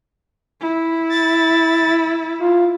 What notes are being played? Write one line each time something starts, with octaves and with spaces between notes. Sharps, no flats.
E4
A6
F4